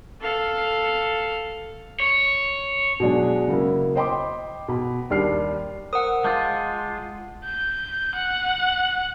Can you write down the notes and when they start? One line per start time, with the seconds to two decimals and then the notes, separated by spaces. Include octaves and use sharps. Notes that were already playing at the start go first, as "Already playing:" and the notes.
0.21 A4 F5
2.00 C#5
3.00 B2 F#3 G#3 D4 G#4
3.48 C#3 F#3 A#3 E4
3.95 C5 D#5 G5 B5 C6 D6
4.68 B2 B5
5.10 D#2 G3 D4 G4 F6 C7
5.93 A#4 C5 F#5 D#6
6.24 G#3 F4 A5 D6 G6
7.45 G6
8.15 F#5